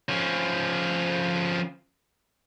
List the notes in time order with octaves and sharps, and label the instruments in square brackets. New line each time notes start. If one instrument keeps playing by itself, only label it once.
[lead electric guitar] F3 C#4